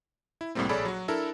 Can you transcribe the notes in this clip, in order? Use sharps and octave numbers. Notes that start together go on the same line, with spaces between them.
E4
C2 A2 C3 G3 A#3 C4
A#1 G#4 A4 C#5 D5 B5
F#3 F#4
D4 E4 A4 A#4